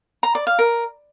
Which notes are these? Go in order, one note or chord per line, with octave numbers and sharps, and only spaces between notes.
A#5
D5
F5
A#4